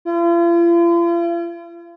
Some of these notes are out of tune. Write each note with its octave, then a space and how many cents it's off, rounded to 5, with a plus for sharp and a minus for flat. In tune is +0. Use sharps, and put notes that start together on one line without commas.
F4 -45